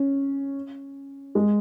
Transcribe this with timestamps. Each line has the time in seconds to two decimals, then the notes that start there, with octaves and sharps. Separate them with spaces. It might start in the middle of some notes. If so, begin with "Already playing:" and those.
Already playing: C#4
1.35 G#3